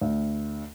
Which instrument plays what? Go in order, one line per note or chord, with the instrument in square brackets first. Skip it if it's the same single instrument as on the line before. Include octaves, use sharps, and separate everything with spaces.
[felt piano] D2